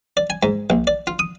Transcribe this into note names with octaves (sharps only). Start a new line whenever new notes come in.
D5
G#5
G#2
A#1
D5
F4
D#6